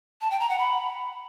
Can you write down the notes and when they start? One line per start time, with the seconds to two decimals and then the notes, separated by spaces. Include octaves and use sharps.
0.21 A5
0.31 G5
0.40 A#5
0.49 F#5
0.59 B5